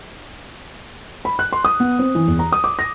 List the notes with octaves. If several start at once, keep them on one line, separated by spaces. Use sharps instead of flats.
B5
F#6
C6
D#6
B3
C4
E3
E2
A#5
D#6
D6
A#6